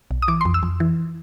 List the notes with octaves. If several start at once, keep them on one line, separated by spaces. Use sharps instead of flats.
B1
D#6
E3 D6
C6
F2
E6
F2
E3